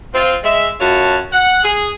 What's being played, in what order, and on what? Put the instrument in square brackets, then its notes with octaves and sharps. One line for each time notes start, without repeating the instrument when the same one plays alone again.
[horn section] C4 F4
G#3 E5
F#2 F4 F#4 C#5 A5
F#5
G#4